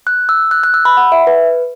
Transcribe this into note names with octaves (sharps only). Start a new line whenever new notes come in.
F#6
E6
F#6
F#6
E6
B5
F#5
E5
B4